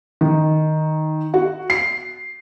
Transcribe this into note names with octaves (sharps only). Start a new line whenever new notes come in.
D#3
F#4
C7